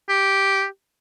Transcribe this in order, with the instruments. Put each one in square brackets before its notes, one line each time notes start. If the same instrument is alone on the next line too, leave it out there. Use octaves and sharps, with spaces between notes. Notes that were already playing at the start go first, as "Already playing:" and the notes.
[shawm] G4